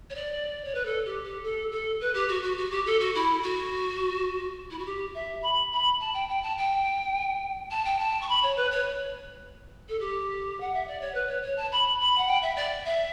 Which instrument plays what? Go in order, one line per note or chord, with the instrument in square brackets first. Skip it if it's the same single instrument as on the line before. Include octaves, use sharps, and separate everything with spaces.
[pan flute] C#5
D5
C#5
B4
A4
G4
G4
A4
A4
B4
G4
F#4
F#4
F#4
G4
A4
F#4
E4
F#4
E4
F#4
G4
E5
B5
B5
A5
G5
G5
A5
G5
A5
G5
A5
C#6
B5
C#5
B4
C#5
A4
G4
F#5
E5
D5
C#5
B4
C#5
C#5
A5
B5
B5
F#5
G5
E5
D5
E5